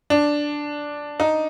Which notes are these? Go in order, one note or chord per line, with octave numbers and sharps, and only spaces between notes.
D4
D#4